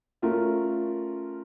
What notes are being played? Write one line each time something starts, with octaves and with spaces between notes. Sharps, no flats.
A3 C#4 F4 A#4